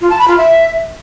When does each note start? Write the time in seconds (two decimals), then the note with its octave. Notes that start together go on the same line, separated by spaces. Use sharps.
0.01 F4
0.10 A5
0.19 B5
0.28 F4
0.37 E5